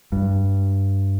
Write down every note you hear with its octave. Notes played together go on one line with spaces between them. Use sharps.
G2